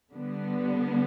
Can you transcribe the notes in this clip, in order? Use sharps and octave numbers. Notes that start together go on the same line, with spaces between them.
D3 G3 B3